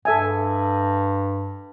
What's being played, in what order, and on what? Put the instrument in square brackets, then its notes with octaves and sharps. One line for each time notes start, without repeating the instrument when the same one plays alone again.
[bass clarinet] G2 [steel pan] A4 E5 G#5